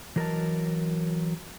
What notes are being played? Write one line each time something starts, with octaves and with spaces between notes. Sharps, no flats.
E3 F#3 A#4 C#5 D#5 A5